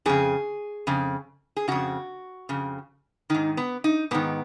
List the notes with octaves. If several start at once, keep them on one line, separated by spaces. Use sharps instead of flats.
F2 C#3 G#4
F2 C#3
G#4
F2 C#3 F#4
F2 C#3
G#2 D#3 D#4
B3
D#4
G#2 D#3 B3